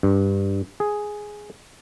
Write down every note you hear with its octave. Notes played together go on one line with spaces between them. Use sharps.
G2
G#4